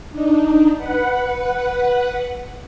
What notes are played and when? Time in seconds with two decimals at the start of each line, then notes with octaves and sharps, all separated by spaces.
0.11 D4 D#4
0.78 B4 F#5